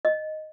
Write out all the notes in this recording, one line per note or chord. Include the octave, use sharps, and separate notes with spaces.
D#5